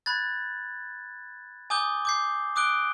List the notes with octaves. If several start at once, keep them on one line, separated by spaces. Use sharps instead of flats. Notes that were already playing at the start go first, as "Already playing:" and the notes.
B5 F#6 G#6 A6
G#5 D6 D#6 G6 G7
D6 G6 C7
D6 D#6 F#6 D7 G7